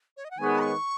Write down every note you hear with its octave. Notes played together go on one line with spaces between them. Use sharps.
C#5
D#5
F#5
D#3 G#3 B3 G#4 C#5 G#5
C#6